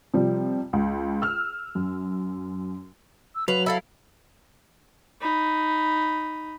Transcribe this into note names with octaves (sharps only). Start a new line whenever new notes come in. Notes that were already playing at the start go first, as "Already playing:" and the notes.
C3 F3 G3
C#2
E6 F6
F#2
E6
F#3 B4 F5 F7
E4 A4 F5 B5
D#4 B5